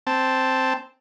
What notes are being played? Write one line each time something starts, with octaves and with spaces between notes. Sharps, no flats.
C4 A5